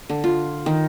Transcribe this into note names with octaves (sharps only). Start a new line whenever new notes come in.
D3
F4
D#3